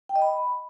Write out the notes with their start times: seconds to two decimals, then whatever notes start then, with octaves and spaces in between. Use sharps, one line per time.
0.09 G5
0.16 D#5
0.22 B5